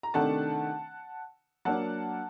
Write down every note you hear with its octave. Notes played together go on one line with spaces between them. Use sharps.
A#5
C3 D#3 A3 D4 F#5 A5
F#3 A#3 D4 F#5 A5